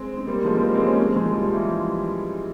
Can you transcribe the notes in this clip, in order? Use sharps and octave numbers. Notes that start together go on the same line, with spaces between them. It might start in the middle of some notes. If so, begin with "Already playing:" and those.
Already playing: G#3 C4
C4
G3 A#3
F3 G#3
C4
G3 A#3
G#3 C4
A#3 C#4
G#3 C4
F3 G#3
G3
F3
E3 G3